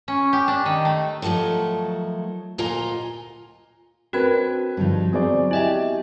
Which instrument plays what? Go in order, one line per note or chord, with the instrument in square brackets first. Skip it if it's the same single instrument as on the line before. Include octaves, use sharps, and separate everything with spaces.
[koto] C#4
G4
D4
D#3
A3
[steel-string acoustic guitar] D3 D#3 F3 F#3 A3
D2 A#2 F4 D#5 G#5 A#5
[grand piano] C4 B4 [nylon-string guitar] D4 A#4 [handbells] F#4 F#6 G#6
[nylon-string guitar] G2 F3 D#4 [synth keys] D3 G3
[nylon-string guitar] F#3 G#3 [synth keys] B3 C4 [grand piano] G#4 C5 D5
[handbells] E4 D#5 E5 [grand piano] G4 G#5